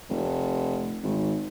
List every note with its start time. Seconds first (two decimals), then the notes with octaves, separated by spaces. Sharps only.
0.09 F1
1.03 G#1